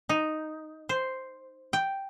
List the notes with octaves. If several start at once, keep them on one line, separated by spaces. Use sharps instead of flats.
D#4
C5
G5